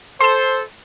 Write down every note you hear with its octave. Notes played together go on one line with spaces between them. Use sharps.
A4 C5 C6 E7